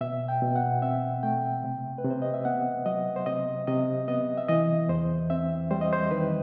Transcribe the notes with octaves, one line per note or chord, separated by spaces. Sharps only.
B2 E5
G5
B2
F#5
C4 E5
A3 G5
C3
B4
C3
C5
D#5
E5
B3 F#5
F#3 D#5
C5
C3 D#5
C3 D#5
B3 D#5
E5
E3 D#5
E2 C5
C4 E5
G3 C5
D#5
C5
D#3 B4